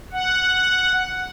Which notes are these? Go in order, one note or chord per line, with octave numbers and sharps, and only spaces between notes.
F#5